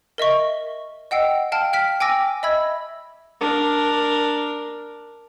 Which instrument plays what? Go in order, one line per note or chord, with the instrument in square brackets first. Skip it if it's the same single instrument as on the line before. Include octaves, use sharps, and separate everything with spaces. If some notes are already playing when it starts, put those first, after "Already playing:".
[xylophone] A#4 D#5 E5 C#6
D#5 F#5 G5 E6 C7
F5 G5 A5 F6
G5 F6 B6
G5 G#5 D6 E6 A#6
D#5 E5 B5 E6 G#6
[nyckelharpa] D4 A#4